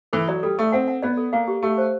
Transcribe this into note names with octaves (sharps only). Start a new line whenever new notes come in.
E3 A4
F#3 D5
G3 A4
A3 A4
C4 F#5
F#5
B3 D5
A4
A#3 F5
G4
A3 G4
C5